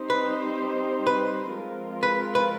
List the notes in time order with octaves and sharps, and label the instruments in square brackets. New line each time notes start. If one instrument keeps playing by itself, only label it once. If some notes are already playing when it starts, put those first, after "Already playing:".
Already playing: [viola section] G3 C4 D#4 G4 C5
[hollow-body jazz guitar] B4
B4
[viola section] F3 G#3 C4 F4 A#4
[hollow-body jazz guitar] B4
B4